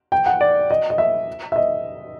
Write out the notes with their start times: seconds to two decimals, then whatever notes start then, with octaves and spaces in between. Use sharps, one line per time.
0.12 G5
0.26 F#5
0.41 D5
0.71 D#5
0.90 D#5
0.98 E5
1.52 E5
1.56 D#5